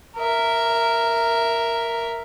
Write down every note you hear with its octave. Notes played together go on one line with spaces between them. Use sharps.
A#4 E5